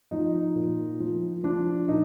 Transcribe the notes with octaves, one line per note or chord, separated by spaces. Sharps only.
F3 D#4
A#2
F3
F3 D4
A#2 D#4